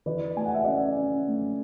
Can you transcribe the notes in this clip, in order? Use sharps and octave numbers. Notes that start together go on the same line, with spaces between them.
E3 B4 D5
A3 G#5
F#5
E5
C#4 D5 F#5
C#4
A3